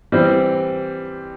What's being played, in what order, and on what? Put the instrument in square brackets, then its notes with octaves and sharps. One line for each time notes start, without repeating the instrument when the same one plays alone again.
[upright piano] E3 G3 C4